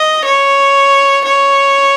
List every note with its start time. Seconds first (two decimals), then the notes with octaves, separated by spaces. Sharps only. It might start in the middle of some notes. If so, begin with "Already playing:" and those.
Already playing: D#5
0.25 C#5
1.25 C#5